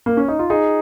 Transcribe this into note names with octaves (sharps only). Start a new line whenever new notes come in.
A#3
C#4
D#4
F4
D#4 G#4